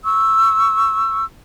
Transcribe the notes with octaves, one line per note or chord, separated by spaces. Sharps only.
C#6 E6